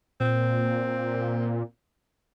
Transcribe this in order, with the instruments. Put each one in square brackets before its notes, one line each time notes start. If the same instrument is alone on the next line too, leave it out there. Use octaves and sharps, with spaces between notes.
[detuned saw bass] A#2 [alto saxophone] C4